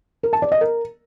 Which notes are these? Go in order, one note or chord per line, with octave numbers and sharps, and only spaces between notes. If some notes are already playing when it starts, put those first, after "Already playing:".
A#4
A5
D5
D#5
A#4